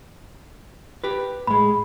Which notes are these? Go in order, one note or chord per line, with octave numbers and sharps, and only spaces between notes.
G4 B4
A2 G#3 B5